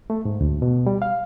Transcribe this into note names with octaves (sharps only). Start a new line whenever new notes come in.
A3
G#2
D2
B2
G3
F5